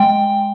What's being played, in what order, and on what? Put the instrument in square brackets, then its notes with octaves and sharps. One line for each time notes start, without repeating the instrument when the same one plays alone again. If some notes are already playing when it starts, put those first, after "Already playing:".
Already playing: [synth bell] G#3 G5